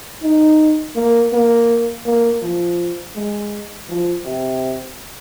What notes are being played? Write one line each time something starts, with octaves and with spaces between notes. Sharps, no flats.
D#4
A#3
A#3
A#3
F3
G#3
F3
C3